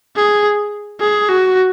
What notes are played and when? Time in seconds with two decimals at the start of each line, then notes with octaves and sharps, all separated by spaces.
0.16 G#4
1.00 G#4
1.28 F#4